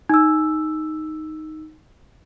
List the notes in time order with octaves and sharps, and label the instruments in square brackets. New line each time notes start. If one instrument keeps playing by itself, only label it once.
[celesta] D#4 E6